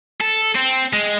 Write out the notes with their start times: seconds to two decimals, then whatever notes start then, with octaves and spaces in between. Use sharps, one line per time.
0.21 A4
0.56 C4
0.93 G#3